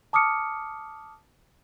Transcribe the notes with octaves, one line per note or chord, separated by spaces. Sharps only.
A5 D6 D#6 F6 C#7